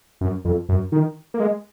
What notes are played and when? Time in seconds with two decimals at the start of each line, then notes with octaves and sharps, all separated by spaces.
0.21 F#2
0.45 F2
0.69 F#2
0.92 D#3
1.34 A#3
1.40 G#3